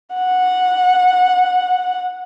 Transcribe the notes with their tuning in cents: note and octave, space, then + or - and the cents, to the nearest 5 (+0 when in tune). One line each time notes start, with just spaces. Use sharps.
F#5 -15